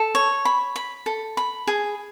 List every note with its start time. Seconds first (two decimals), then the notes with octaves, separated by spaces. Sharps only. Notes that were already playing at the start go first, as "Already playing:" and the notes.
Already playing: A4
0.15 C#5
0.45 B5
0.76 B5
1.06 A4
1.37 B5
1.67 G#4